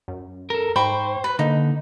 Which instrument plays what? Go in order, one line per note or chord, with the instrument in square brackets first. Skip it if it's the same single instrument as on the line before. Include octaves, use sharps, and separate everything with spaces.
[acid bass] F#2
[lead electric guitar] A4 A#4
[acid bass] G#2 [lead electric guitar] C5 [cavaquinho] G5 B5 C#6
[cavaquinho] B4
[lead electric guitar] D3 [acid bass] A#3 [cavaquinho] D#4